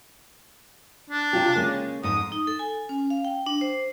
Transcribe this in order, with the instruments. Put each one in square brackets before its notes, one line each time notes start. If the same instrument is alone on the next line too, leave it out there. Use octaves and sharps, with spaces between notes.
[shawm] D4
[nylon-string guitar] C3 F4 G4
C#3 G#3 A#3
[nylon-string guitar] F2 G#2 [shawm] D#6
[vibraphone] D#4
A4
G#5
C#4
F5
G5
D4
C5